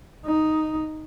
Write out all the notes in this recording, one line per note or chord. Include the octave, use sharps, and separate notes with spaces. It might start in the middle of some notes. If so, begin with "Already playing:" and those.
D#4